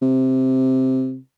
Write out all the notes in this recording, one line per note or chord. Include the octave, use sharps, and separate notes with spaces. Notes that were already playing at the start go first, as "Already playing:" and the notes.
C3